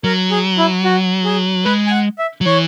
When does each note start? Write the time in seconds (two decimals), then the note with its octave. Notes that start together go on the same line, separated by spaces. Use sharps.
0.04 F#3 A#4
0.30 G#4
0.58 E4
0.84 F#4
1.25 G#4
1.65 G#3 B4
1.87 G#5
1.91 F#5
2.18 E5
2.41 F#3
2.46 E3 C#5